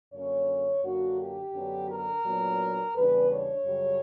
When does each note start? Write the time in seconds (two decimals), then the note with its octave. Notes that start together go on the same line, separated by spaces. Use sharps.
0.13 F#2 D3 A#3 C#4 C#5
0.83 F#2 D3 A#3 D4 F#4
1.19 G4
1.54 F#2 D3 F#3 B3 D4
1.89 A#4
2.24 A#2 F#3 B3 D4
2.95 E2 C#3 G3 B3 D4 B4
3.30 C#5
3.65 F#2 C#3 G3